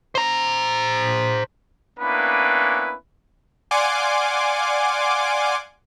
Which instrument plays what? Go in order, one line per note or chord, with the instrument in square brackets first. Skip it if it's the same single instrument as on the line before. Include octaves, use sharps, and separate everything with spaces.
[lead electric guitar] C5 A#5
[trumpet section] A#3 B3 C#4 D4 E4 B4
[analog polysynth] D5 F5 F#5 G#5 C6 D6